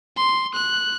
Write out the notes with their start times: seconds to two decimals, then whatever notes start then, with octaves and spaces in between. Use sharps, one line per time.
0.17 C6
0.55 F#6